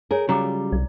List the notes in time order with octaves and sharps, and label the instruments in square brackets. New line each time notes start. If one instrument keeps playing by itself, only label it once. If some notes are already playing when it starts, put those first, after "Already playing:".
[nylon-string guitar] G#4 A#4 [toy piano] C#5 G#5
[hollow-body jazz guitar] C#3 F#3 G3 [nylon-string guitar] F4 [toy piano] A#5 D6
[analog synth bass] C2 [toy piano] D5